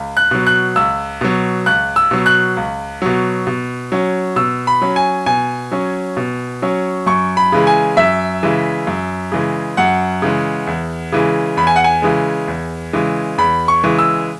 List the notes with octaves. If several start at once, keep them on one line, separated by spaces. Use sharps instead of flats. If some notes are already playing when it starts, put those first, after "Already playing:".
Already playing: C#2
F#6
B2 F#3
F#6
C#2 E6
B2 F#3
C#2 F#6
E6
B2 F#3
F#6
C#2
B2 F#3
B2
F#3 C#4
B2 E6
B5
F#3 C#4
G#5
B2 G#5
F#3 C#4
B2
F#3 C#4
F#2 C#6
B5
C#3 E3 G#3
G#5
F#2 E5
C#3 E3 G#3
F#2
C#3 E3 G#3
F#2 F#5
C#3 E3 G#3
E2
C#3 E3 G#3
E2 B5
G#5
F#5
G#5
C#3 E3 G#3
E2
C#3 E3 G#3
E2 B5
C#6
C#3 E3 G#3
E6